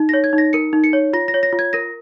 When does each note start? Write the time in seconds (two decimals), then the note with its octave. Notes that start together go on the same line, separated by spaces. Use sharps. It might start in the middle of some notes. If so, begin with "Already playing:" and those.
Already playing: D#4
0.09 A#6
0.14 C#5
0.24 G#6
0.33 D#4
0.38 A#6
0.53 A#4 C#7
0.73 D#4
0.84 C#7
0.93 C#5
1.13 F4 A#6
1.28 A#6
1.34 C#5
1.43 A#6
1.53 F4
1.59 G#6
1.73 A#4 A#6